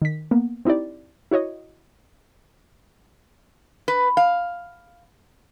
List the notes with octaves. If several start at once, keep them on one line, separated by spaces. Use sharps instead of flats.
D#3 B6
A#3 B3
C4 D#4 E4 G4 D5
E4 F#4 C#5 D#5
B4
F5